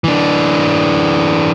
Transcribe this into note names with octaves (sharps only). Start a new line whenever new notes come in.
E3 D4